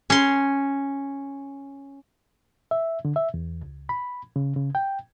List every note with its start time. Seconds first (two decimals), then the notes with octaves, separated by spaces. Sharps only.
0.10 C#4 C6
2.71 E5
3.05 D3
3.16 E5
3.34 E2
3.62 C#2
3.89 B5
4.36 C#3
4.56 C#3
4.75 G5